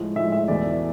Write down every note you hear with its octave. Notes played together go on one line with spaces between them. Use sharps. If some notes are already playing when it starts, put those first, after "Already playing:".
Already playing: A2 F3 G#3
A2 F3 G#3 E5
E5
E2 B2 A3 D5